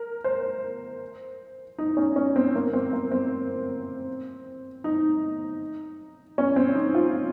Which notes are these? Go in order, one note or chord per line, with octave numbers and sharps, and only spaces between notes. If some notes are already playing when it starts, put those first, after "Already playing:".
Already playing: A#4
C5
D#4
C#4
C#4
C4
A#3
C4
A#3
C4
D#4
C#4
C4
D#4
F4